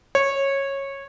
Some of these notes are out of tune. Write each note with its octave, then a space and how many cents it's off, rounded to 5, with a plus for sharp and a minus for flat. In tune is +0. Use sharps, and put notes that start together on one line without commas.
C#5 -15